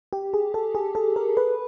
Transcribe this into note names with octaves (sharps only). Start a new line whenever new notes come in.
G4
G#4
A4
G#4
A4
A#4
B4